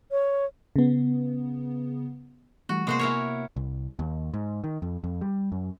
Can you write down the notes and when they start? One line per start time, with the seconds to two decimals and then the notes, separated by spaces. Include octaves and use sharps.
0.11 C#5
0.76 C#3 B3
2.69 E3 G3 A3 F#4
2.87 C3 G#3 A#3 B3 F#4 C5
2.99 E4 A#4 C#5
3.56 C2
3.99 D#2
4.34 G#2
4.64 D#3
4.82 F2
5.04 F2
5.21 G3
5.52 F#2